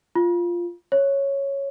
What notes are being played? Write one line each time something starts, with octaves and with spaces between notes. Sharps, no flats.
F4
C#5